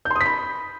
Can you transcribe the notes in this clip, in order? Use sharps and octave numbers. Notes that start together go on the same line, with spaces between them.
G6
C6
D#6
B6
B5